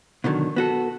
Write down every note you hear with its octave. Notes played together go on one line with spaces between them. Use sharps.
B2 D3 D#3 F#3
B3 F#4 A4